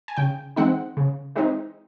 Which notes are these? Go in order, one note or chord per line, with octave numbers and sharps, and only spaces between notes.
G#5
C#3 G5
E3 G#3 C4 D#4 F#5
C#3
E3 G#3 C4 D#4